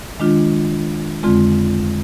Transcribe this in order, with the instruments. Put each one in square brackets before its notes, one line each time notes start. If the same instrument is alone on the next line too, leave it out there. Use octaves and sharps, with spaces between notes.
[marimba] D#3 G#3 D4 F4
F2 D3 G#3 C4 F4